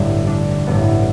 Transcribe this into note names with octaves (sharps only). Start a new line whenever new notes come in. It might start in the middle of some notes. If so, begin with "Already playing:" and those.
Already playing: A1 G2 D3 D4
D4
A1 G2 D3 B3